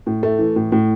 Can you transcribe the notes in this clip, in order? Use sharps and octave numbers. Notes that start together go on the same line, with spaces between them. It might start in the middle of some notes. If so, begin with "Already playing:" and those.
A2
A3
E3
A2
A2